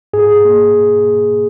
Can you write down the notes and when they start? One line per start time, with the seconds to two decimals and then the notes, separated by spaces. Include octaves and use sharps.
0.13 G#2 G#4
0.45 A#3